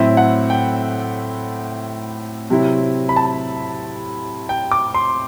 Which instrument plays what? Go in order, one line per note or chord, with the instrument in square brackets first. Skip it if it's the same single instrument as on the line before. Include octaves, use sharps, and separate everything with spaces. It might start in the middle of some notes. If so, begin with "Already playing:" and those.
Already playing: [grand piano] A2 F#3 C4 E4 E5
F#5
G5
C3 F#3 C4 E4
B5
A5
G5
D6
C6